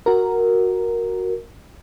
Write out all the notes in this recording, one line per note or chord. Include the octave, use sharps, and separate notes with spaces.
F#4 A#4